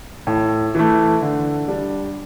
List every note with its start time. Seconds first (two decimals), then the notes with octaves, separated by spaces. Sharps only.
0.27 A2
0.75 E3 A3
1.22 D3
1.68 G3 D4